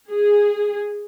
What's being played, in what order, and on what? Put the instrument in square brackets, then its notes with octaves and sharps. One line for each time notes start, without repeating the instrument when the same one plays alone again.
[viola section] G#4